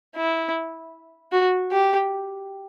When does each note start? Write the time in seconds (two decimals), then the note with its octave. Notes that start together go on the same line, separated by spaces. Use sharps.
0.16 E4
1.32 F#4
1.72 G4